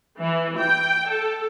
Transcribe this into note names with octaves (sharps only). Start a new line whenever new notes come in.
E3
G5
A4